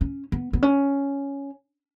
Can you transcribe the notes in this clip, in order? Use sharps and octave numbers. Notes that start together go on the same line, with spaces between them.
C#4
B3
B3
C#4